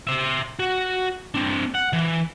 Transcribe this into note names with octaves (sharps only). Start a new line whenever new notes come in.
C5 E5
F#4
C4 D4
F#5
E3